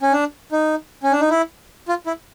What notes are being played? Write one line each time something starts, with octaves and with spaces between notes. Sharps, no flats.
C#4
D4
D#4
C#4
D4
D#4
E4
F4
E4